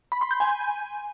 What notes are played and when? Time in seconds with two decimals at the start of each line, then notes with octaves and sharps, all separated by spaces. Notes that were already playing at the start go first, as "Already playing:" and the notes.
0.12 B5
0.21 C6
0.31 G6
0.40 G#5